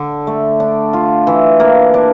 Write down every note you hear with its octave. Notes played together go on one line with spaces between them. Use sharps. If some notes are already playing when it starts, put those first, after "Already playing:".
Already playing: D3
A3
D4
F4
E3
A#3
D4